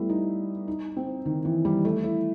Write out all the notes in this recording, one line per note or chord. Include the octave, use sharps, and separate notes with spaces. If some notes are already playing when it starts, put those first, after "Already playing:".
Already playing: G3 A3 B3 E4
D#4
D#4
C4
D#3
E3
G3
A3
E4